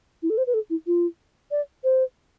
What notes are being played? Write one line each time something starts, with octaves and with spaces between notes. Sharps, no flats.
E4
A4
C5
B4
A4
E4
F4
D5
C5